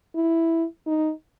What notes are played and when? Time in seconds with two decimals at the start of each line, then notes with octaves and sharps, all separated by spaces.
0.15 E4
0.86 D#4